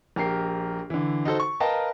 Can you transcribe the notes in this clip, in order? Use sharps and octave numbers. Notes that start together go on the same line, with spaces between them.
A#1 G4 A#4 C7
D3 E3
D#4 F#4 A4 C5
C#6
A#4 B4 D#5 F5 G5 A5